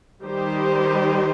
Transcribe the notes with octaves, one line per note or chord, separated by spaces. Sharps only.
D#3 G3 D#4 G4 C5